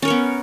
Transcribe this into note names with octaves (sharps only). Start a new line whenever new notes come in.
B3 C#4 A#4 C#5